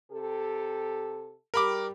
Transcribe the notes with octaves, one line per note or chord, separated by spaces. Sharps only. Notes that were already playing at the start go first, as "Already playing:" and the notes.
C3 G4 A4
G3 G4 A#4 B5 D6